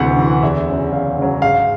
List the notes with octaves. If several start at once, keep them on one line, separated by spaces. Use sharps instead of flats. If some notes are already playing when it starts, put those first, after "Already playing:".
Already playing: D2 C3 E3 F#5
C3 E3
E2 E5
C#3 F#3
E2 F5
C#3 F#3
G#2 F5